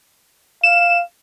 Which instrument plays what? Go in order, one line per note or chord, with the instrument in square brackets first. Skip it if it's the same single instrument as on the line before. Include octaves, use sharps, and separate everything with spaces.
[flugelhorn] F5 [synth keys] E7